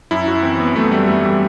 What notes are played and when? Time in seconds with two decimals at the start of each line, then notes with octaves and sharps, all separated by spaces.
0.11 F#2 E4
0.28 F#4
0.43 E3 C4
0.60 B3
0.76 F#2 A3
0.92 G3
1.07 E3 A3
1.24 G3